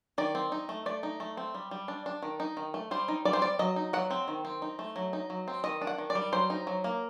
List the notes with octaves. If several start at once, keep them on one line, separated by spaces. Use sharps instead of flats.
D#3 D5
C4
D#4
A3
A3 D5
D#4
A3
C4
G3
G3
D4
D4
D#3
D#4
D#3
A3
G3 C5
D#4
G3 D5
C5
C4 D5
F#3 D#5
D#4
F#3 F#5
C4
D#3
C4
D#4
A3
F#3
D#4
F#3
C4
D#3 D#5
D4
F#5
D#3
D5
G3
F#3 C5
D#4
F#3
A#3